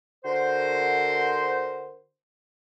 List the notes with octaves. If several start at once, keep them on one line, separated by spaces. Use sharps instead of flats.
D3 F#4 A#4 C5